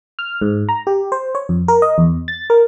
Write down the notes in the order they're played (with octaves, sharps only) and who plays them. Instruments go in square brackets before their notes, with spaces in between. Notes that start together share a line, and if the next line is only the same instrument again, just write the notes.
[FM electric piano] F6
G#2
A#5
G4
C5
C#5
F2
A#4
D#5
E2
A6
A#4